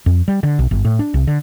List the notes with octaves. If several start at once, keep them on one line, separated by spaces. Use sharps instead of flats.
F2
G3
D3
B1
G1
A2
D4
C2
D3